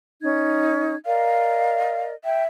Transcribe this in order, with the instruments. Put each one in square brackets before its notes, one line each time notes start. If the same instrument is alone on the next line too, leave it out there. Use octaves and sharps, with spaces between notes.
[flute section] C#4 D#4 G#6
[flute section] A#4 D5 D#5 [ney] F5
[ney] E5 [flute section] G5